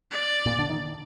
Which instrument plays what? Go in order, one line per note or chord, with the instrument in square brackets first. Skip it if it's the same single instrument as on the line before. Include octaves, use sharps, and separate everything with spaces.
[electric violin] D5
[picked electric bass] A#2
D3
D#3